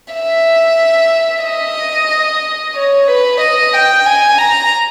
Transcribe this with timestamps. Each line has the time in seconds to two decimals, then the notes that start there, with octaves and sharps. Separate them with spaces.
0.14 E5
1.44 D#5
2.76 C#5
3.08 B4
3.41 D#5
3.74 G5
4.07 G#5
4.38 A#5